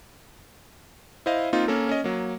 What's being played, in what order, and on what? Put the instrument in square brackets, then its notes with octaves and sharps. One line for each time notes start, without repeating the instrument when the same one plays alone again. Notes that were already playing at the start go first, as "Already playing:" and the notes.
[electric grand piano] E4 C5 D#5 F5
A#3 C4 D#4 F4
A#3 C#4 A4 A#4
C#4 D#5
F#3 A#3